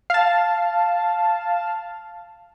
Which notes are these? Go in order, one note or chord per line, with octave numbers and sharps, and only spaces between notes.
F5 A5